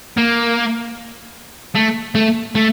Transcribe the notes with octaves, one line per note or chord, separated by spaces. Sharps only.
A#3
A3
A3
A3